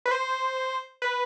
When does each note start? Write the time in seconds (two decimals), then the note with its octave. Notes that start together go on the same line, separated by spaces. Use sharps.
0.06 B4
0.11 C5
1.02 B4